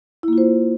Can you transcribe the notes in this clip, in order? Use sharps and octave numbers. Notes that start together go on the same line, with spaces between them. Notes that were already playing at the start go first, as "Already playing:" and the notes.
A#3 E4 F4 C5